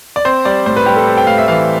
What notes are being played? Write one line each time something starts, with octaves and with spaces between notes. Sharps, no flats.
D5
C4 C5
G3 D5
A2 C5
B4
G3 G4
A4
C4
G5
A2 F5
E5
E3 F5